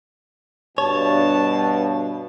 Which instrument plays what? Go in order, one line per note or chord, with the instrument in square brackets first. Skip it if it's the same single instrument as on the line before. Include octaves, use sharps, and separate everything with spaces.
[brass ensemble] G2 B2 [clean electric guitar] C#5 [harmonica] A5